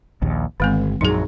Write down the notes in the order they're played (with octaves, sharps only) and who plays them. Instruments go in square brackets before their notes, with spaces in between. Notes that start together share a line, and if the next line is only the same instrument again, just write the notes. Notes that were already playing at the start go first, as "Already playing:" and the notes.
[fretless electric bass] A#1 D#2
[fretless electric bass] G1 [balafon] D#3 G#3 C4
[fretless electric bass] A#1 F#2 F#3 [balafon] D#4 G#4